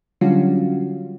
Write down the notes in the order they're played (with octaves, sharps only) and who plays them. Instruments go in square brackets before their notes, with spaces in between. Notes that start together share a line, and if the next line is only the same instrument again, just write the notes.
[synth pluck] D3 F#3 G3 C#4 F4 F#4